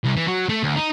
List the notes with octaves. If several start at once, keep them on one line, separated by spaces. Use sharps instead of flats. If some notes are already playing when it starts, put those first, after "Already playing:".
C2
E3
F#3
A3
D2
D#4